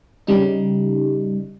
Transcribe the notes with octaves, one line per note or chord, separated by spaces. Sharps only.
C#3 G3 D#4